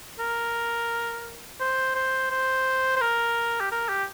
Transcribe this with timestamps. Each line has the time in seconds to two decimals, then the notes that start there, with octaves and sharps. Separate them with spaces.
0.19 A#4
1.60 C5
1.95 C5
2.31 C5
2.96 C5
3.01 A#4
3.61 G4
3.72 A#4
3.89 G4